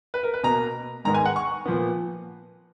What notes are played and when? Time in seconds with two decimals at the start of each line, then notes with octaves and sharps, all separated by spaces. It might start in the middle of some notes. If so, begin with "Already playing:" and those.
0.14 B4
0.23 A#4
0.34 B4
0.43 B2 A#3 A#5
1.05 G#2 D#3 G#3 B3 A#5
1.14 G#5
1.25 F#5
1.36 C#6
1.65 A#2 F3 B3